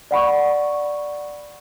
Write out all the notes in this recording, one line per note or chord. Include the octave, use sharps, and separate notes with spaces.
D5 F#5 B5 C#6